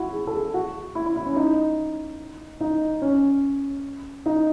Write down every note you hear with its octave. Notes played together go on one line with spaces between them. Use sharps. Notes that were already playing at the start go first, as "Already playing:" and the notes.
Already playing: E4 F#4
G#4
A4
G#4
F#4
E4
E4
E4
C#4
D#4
D#4
C#4
D#4